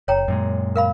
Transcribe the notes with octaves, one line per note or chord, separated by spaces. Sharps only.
F#1 C#5 G5 A#5
F#2 A#2 G#3
A#4 F5 B5